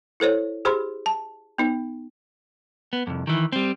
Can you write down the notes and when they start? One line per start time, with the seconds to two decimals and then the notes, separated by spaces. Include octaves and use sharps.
0.20 E4 A4 C5 C#5
0.65 G4 G#4 C5 B5 C6
1.06 A5
1.58 B3 D#4
2.93 B3
3.07 C2 F2
3.27 D#3 E3
3.52 G3 C4